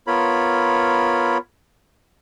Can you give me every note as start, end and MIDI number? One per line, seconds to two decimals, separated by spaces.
0.07 1.38 59
0.07 1.38 65
0.07 1.38 70
0.07 1.38 73
0.07 1.38 83